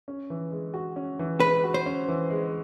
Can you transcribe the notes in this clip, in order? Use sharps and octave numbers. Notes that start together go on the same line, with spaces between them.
C#4
E3
G#3
F#4
C#4
E3
G#3 B4
F#4
C5
C#4
E3
G#3